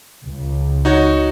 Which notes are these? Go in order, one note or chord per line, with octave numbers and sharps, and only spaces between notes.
C#2
D#4 F#4 C#5